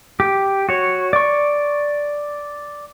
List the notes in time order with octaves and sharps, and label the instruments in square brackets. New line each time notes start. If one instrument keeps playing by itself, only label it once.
[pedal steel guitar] G4
F#4 C#5
D5 C#6